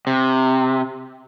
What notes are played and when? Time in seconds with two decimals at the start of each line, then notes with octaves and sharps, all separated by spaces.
0.07 C3